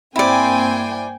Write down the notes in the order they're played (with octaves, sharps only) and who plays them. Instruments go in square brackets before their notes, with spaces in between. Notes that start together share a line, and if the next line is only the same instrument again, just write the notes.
[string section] G2 A#3 C5 [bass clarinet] C4 [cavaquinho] E4 D5 [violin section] G5 G#5